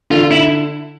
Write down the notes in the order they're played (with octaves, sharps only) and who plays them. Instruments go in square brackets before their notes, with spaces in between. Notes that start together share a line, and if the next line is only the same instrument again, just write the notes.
[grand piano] D3 [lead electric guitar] F4
[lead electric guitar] E4